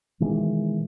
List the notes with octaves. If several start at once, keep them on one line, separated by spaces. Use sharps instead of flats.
B2 D#3 E3 G#3